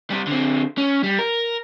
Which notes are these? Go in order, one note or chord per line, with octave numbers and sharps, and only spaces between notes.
C3 G3
D3 C4
C#4
G3
A#4